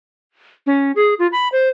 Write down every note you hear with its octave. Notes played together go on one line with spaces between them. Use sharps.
C#4
G#4
F4
B5
C5